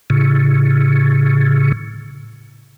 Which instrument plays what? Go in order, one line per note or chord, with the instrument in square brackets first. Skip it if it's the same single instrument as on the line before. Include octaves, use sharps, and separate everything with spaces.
[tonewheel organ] A2 C#3